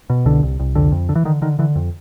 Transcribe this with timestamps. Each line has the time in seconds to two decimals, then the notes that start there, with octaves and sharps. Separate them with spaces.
0.10 B2
0.25 C2 D3
0.43 C2
0.60 C2
0.75 F2 D3
0.92 F2
1.09 D3
1.15 E3
1.25 D3 D#3
1.42 D3 D#3
1.59 D3 E3
1.76 F2